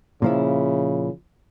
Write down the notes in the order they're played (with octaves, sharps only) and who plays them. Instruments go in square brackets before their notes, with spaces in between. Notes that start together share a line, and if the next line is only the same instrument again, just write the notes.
[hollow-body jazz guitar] A#2 F3 E4 [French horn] C#3